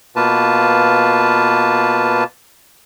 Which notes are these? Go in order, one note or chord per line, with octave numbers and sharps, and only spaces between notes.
B2 A#3 F4 B4 A5